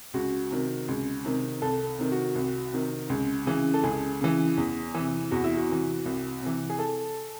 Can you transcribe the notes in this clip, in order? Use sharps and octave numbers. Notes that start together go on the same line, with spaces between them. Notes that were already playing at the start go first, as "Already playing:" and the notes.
C#2 F#4
C3 D#3
C#2
C3 D#3
C2 A4
C3 D#3
F#4
C2
C3 D#3
C#2
C#3 E3
A4
C#2 G#4
C#3 E3
E2
C3 E3
E2 F#4
E4
F#4
C3 E3
C2
C3 E3
G#4
A4